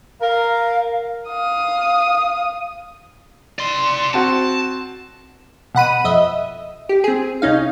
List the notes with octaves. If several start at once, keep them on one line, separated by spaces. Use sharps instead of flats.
A#4 F5
F5 D#6
D5 C6
C4 F#4 A5
B2 F#5 B5 D#7
F2 D#5 E5
G4
C4 G#4
C2 C#4 D#4 F5